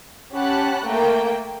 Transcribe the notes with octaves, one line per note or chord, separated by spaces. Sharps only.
C#4 G4 F#5 A5 B5 F#6
A3 A#3 A#4 G5